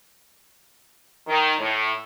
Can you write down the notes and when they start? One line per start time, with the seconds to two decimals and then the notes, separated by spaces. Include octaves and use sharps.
1.28 D#3
1.59 A2